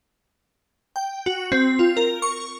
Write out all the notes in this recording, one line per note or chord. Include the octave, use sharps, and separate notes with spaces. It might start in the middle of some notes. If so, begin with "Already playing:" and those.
G5
F#4
C4
F4
A#4
C#6